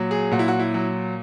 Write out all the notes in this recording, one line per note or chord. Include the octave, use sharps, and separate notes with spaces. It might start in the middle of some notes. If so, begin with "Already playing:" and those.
Already playing: A#2 F#3
G#4
A#2 F#4
E4
F#4
E4
F#3